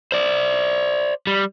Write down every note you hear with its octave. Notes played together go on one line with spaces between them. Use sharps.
C5 D5
G3